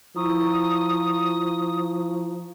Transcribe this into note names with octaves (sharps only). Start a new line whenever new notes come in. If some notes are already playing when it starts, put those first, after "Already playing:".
F3 E4 A#5 C#6 D#6